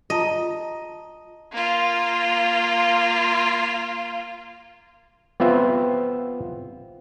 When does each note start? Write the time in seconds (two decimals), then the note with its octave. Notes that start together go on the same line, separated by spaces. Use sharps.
0.10 F4 D#5 A5 A#5
1.52 A#3 F4
5.40 B3 C4 F4 E5